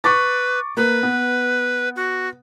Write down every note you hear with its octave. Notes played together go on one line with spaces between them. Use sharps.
B4 C#6 D6 A6
A#3 B4
B3
F#4